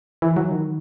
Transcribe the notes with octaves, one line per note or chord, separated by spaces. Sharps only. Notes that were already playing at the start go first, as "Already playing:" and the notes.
E3
F#3
D#3